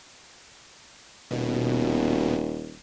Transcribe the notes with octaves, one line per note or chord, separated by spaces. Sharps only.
D#1 B2